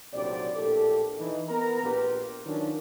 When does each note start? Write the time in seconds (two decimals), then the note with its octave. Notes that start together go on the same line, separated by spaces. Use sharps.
0.13 A#1 D#2 A2 C3 F#3 D5
0.56 A#1 A2 G4 A4
1.18 E3 D#4
1.48 B3 A#4 A#5
1.83 A#1 F4 G4 B4
2.45 D#3 F#3 C#4 D4 F4